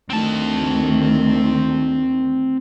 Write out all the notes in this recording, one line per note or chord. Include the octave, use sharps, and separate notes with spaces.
D2 D#3 A3 C4 A5